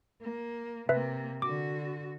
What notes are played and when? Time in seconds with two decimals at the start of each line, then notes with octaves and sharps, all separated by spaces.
0.21 A#3
0.89 C3 A#3 B4 E5
1.42 D3 F#4 D6